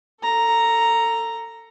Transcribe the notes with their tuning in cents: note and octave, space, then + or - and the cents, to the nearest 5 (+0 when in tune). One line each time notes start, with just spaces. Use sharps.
A4 +25 A#5 +0